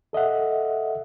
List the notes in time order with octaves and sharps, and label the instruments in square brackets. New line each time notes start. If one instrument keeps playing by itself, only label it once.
[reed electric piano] A4 D#5 E5 F#5